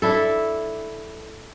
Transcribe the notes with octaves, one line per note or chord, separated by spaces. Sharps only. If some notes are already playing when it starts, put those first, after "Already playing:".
D4 E4 A4